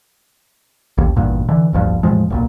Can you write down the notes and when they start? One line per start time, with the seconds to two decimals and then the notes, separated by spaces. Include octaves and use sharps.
0.98 A1 D#2
1.16 G#1 E2 G2 A#2
1.48 D3 E3
1.73 D1 A#1 G2 F3
2.03 E2 A2 F3 G#3
2.30 D#1 B1 A#2